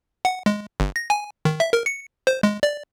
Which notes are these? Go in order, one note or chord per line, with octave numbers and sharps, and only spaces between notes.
F#5
G#3
G1
A#6
G#5
D#3
E5
A#4
C#7
C5
G#3
D5